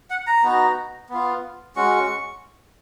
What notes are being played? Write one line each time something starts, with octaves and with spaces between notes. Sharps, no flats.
F#5
A#5
B3 D#4 F#4
B3 F4
G#3 C#4 F#4 C#6